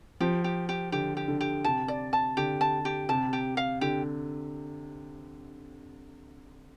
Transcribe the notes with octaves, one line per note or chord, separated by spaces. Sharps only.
F3 G4
G4
G4
D3 G4
G4
D3
G4
C3 A5
D5
A5
D3 G4
A5
G4
C3 A5
G4
F5
D3 G4